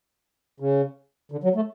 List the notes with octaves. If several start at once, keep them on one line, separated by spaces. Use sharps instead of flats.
C#3
D3
F#3
A3